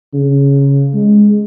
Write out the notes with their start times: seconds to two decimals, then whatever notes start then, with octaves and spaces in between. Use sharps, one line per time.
0.14 C#3
0.94 G#3